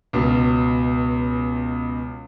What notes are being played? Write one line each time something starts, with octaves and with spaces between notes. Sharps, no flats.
C#2 B2